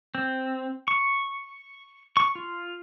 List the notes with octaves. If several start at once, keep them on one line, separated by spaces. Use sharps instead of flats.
C4
C#6
C#6
F4